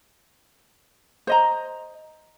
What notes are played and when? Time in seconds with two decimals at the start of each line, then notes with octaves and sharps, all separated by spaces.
1.27 C5 D#5 A#5